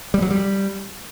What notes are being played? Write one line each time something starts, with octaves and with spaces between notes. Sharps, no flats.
G3
F#3
G3